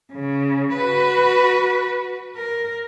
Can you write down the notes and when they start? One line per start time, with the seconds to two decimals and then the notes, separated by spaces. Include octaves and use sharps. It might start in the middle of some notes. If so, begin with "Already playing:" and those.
0.12 C#3
0.75 F#4 B4
2.36 A#4